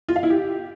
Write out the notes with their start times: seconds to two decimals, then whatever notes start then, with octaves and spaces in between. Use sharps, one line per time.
0.09 F4
0.16 F5
0.23 E4
0.30 G4